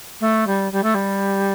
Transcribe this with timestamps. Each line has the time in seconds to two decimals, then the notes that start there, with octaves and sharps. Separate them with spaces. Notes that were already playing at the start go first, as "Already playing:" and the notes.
0.20 A3
0.47 G3
0.72 G3
0.83 A3
0.94 G3